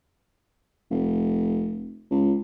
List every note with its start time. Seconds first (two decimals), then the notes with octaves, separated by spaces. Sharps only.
0.91 F1
2.10 C#2